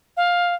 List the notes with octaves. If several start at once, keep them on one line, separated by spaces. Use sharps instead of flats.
F5